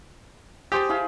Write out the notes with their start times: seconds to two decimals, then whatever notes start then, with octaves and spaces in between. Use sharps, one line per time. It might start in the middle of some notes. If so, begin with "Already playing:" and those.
0.72 G4 G#4 C5 A5
0.89 E4 G#4 F5